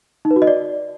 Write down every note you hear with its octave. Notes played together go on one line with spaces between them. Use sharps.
D#4
B4
F#4
D#5
D5